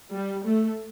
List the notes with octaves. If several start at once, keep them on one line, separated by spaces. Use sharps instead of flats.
G3
A3